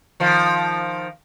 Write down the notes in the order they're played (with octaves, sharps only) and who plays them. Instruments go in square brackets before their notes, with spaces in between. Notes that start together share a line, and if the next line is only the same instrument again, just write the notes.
[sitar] D#3 F3